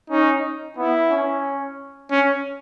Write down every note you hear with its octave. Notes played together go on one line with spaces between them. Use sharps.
C#4 D#4
B3 E4
C#4
C#4